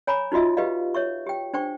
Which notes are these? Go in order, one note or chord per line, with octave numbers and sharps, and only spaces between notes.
C#5 G#5 A#5 B5 D6
D#4 F4 F#4 D#5 E5
G4 B4 D#5 F5
C#5 E5 C#6
G4 G5
D4 C5 G5 C#6